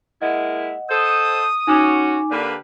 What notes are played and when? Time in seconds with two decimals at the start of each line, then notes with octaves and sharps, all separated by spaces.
0.22 G#3 A#3 E4 D#5 F#5
0.90 A4 C5 D#6
1.67 C#4 D#4 F#4 G#5 D6
2.31 D3 A#3 D4 G4 B4